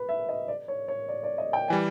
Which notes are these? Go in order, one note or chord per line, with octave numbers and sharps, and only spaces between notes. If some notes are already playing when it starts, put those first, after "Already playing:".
Already playing: B4
E5
D#5
D5
C#5
C#5
D5
D5
D#5
G5
E3 G3 G#5